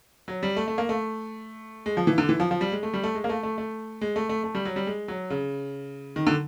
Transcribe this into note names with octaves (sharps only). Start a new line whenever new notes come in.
F#3
G3
A3
A3
A#3
A3
G#3
F3
E3
D3
E3
F3
F3
G3
G#3
A3
G3
A3
G#3
A#3
A3
A3
A3
G#3
A3
A3
A3
G3
F#3
G3
G#3
F#3
C#3
D#3
D3